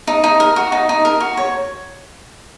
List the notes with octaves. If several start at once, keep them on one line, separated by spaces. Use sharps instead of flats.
D#4
D#4
A#4
F#4
D#4
D#4
A#4
F#4
C#5